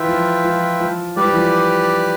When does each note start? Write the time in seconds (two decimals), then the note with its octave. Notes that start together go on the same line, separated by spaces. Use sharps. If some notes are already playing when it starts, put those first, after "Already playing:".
Already playing: E3 F4 B4 E5 G5
0.08 F3
0.44 F3
0.80 F3
1.16 G3 G4 B4 D5
1.24 F3
1.33 E3
1.40 F3